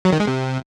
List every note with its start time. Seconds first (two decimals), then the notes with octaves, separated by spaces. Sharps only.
0.05 F#3
0.12 D#3
0.20 G#3
0.27 C3